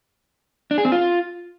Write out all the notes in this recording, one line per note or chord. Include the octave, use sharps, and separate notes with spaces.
D4
G#4
C4
F4